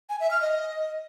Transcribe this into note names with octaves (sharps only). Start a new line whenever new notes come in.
G#5
E5
F6
D#5